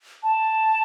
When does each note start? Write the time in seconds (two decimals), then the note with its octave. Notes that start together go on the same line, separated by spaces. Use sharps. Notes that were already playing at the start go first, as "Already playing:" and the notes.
0.23 A5